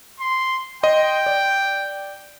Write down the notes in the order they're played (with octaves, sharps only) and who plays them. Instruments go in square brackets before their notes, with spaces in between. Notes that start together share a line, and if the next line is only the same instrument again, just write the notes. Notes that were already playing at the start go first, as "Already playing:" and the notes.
[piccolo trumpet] C6
[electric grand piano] D#5 C6 [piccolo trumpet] G5
[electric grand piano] D5